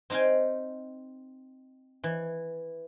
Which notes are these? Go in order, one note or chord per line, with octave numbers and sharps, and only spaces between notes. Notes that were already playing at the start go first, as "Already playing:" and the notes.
C4 D#4 F5 G5 G#5
E3